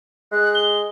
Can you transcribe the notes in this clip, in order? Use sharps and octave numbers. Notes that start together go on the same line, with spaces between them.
G#3 F#6
G7